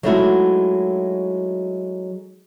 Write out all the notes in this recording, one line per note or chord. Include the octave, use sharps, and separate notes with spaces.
F#3 G#3 A3 D#4 E4 F#4